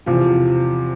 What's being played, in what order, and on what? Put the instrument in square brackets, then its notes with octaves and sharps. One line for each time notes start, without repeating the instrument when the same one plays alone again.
[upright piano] E2 C3 F3